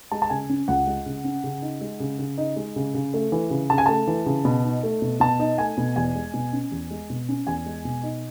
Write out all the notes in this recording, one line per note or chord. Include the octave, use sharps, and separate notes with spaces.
G#3 A5
A5
C#3 G#5
C#4
C#2 F#5
G#3
C#3
C#4
C#3
D#4
G#3
C#3
C#3
D#4
G#3
C#3
C#3
A3
E3
C#3
C#3 A5
G#5
A3 A5
E3
C#3
B2
D#4
A3
B2
B2 A5
D#4
A3 G#5
B2
E2 G#5
G#3
B2
C#4
E2
G#3
B2
C#4
E2 G#5
G#3
B2
D#4